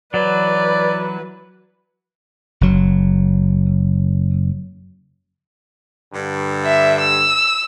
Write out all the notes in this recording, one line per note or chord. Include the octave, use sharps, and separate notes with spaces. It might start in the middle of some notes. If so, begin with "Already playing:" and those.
E3 F#3 B4 D5
F#1 F#3
G2 D3
E5
E6